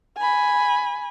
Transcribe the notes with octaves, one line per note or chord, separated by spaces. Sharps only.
G#5 B5